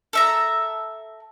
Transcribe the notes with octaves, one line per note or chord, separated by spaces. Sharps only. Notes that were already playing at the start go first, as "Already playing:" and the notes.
A4 E5 A#5